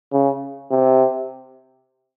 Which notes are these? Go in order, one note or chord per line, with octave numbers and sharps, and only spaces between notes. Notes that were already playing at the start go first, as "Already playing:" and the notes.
C#3
C3